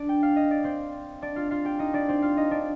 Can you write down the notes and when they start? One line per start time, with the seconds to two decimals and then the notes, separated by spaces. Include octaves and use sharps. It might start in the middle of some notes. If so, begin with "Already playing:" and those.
Already playing: D4 D5
0.09 G5
0.23 F5
0.36 D#5
0.51 D5
0.64 C4 C5
1.22 D4 D5
1.36 F4 F5
1.51 F4 F5
1.65 G4 G5
1.79 D#4 D#5
1.93 D4 D5
2.08 C4 C5
2.22 F4 F5
2.37 D#4 D#5
2.51 D4 D5